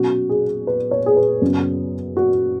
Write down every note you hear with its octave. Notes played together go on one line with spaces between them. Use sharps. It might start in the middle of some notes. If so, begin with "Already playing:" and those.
Already playing: B2 F#3 C#4 F#4
G#4
B4
C#5
G#4
B4
F#2 C#3 B3
F#4